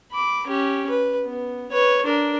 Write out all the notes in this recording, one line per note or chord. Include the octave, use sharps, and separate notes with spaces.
B5 D6
C#4 G4
B4
B3
B4 C#5
D4 A#4